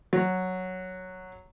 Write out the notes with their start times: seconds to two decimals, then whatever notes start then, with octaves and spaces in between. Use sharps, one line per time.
0.13 F#3